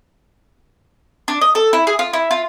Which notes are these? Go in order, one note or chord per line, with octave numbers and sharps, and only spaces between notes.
D4
D#5
A4
E4
G#4
F4
E4
F4